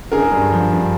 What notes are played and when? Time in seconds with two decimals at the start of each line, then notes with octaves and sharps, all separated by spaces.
0.12 D3 G#4 A#4
0.32 G2
0.52 F3
0.72 G2